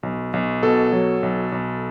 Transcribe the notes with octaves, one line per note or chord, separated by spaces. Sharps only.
B1
B1
B2 A4
F#3
B1
B1